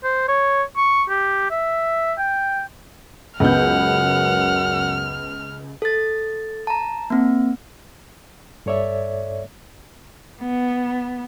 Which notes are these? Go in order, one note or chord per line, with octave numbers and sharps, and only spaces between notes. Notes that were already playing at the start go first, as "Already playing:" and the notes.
C5
C#5
C#6
G4
E5
G5
C#2 F#2 B3 F#5 F6 G6
A4 A6
A5 A#5
A#3 C4
G2 A4 C#5 D5 E5
B3